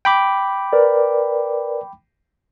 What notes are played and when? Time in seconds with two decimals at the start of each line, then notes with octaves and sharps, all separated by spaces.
0.05 G5 B5 D6
0.73 A#4 B4 D5